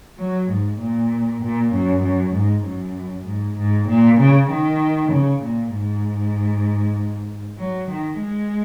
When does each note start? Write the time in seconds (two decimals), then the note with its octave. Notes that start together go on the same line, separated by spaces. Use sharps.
0.18 F#3
0.50 G#2
0.80 A#2
1.42 A#2
1.73 F#2
2.03 F#2
2.34 G#2
2.65 F#2
3.26 G#2
3.58 G#2
3.88 A#2
4.19 C#3
4.50 D#3
5.12 C#3
5.43 A#2
5.73 G#2
7.58 F#3
7.90 D#3
8.20 G#3